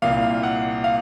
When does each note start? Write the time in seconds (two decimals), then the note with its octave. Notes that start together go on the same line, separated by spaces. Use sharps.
0.02 C2 A#2 F5
0.43 F#5
0.84 F5